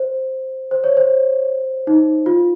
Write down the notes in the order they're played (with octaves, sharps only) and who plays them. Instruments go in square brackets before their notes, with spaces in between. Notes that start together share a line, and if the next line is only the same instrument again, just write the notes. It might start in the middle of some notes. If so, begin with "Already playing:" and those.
Already playing: [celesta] C5
C5
C#5
C5
D#4
F4